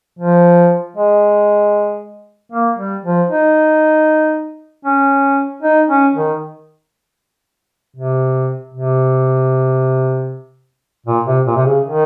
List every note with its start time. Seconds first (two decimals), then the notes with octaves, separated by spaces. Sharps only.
0.19 F3
0.96 G#3
2.52 A#3
2.78 G3
3.04 F3
3.30 D#4
4.85 C#4
5.62 D#4
5.88 C#4
6.15 D#3
7.96 C3
8.74 C3
11.06 A#2
11.26 C3
11.47 A#2
11.56 C3
11.66 C#3
11.85 D#3